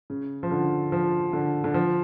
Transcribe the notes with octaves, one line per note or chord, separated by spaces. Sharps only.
C#3
F3
D3
F3
D3
D3
F3